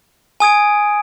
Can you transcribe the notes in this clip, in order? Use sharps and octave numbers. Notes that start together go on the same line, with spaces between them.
G#5 D#6 G#6 D7